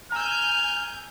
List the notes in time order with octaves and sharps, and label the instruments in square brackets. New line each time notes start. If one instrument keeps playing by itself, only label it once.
[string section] G#5 G6 [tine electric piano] A#5 E6 [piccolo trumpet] F6